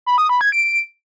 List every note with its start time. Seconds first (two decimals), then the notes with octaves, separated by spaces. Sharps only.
0.06 B5
0.18 D#6
0.29 B5
0.41 G#6
0.52 D7